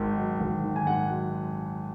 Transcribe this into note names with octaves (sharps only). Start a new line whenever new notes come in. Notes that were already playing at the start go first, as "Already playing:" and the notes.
Already playing: G#1 G#2 D#3
F#3
G#1
D#3
G#5
G#2 F#5
F#3